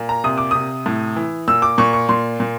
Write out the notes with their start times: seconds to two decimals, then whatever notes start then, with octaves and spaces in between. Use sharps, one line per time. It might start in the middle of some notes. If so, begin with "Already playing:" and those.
Already playing: A#2
0.09 A#5
0.24 C3 D#6
0.38 D6
0.51 C3 D#6
0.86 A2
1.16 E3
1.48 A#2 E6
1.62 D6
1.78 A#2 C#6
1.93 C#6
2.09 A#2 C6
2.40 A#2